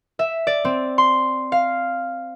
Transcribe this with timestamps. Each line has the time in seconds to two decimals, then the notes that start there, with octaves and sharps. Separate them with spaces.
0.19 E5
0.47 D5
0.65 C4
0.98 C6
1.52 F5